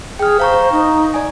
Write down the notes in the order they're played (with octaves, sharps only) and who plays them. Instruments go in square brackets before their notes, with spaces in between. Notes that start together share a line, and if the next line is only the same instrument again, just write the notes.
[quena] G#4 [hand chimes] G5 F6
[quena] C5 [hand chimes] F5 A#5 C#6
[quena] D#4
[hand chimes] D5 G#5